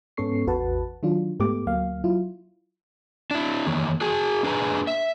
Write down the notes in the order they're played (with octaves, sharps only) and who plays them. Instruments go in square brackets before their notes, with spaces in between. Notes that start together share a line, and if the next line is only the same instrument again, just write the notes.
[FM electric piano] G#2 B3 C#4 A4 C#6 C7
A1 E2 F#4 B4 F#5 A5
D#3 F#3 D4 F4
G#2 A3 B3 G4 D6
D2 F#3 A#3 F5
F#3 E4 F4
[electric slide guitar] D4 E4
D#3 E3 A#3
F#4 G#4 G#5
A#3 D4 G#4 B4 G#5 A#5
E5